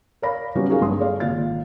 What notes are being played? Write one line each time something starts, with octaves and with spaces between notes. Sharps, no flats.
A#4 C#5 D5 F5 B5 A#6
F#3 G3 B3 C#4 F4 G4
D#4 F#4 G#4 A#4 F5
A#1 G2 C6 D#6
G#4 A4 C#5 D5 F5
G#1 A#2 F4 F5 A6